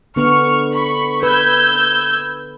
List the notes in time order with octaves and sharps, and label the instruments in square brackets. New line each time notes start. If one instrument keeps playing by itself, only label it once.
[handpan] D3 B3 [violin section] C#6 F6
[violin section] B5 C#6
[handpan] B4 [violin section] E6 G6 G#6